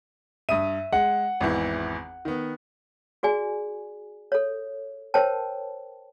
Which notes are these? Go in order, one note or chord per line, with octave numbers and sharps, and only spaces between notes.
G2 E5 D#6 D#7
G#3 F#5
G#1 E2 E3
D#3 B3
F#4 G#4 D5 G#5
A4 C#5
A#4 C5 C#5 G5 A5